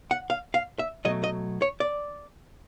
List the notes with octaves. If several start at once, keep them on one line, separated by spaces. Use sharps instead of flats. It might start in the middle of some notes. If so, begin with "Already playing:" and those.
F#5
F5
F5
E5
B2 F#3 A3 D#5
D#5
C#5
D5